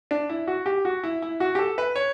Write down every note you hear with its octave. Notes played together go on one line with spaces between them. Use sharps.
D4
E4
F#4
G4
F#4
E4
E4
F#4
G4
A4
B4
C#5